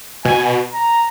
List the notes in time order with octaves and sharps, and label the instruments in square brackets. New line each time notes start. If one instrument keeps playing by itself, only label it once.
[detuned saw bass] B2 [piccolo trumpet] G#5
[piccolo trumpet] A#5